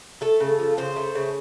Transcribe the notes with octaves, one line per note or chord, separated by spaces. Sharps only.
A3 A4
C#3
F3
C#3 C5
A3
C#3